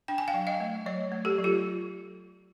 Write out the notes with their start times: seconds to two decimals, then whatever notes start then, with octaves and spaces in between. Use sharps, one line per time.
0.08 D4 G5
0.18 G#5
0.28 F5 G5
0.34 F#3
0.47 D#5 F5
0.60 A3
0.86 F#3 C#5 D#5
1.12 A3
1.25 G4 A4
1.38 F#3
1.44 F4 G4